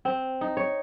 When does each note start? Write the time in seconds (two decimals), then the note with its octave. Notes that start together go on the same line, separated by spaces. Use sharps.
0.05 C4
0.41 D#4
0.57 C#5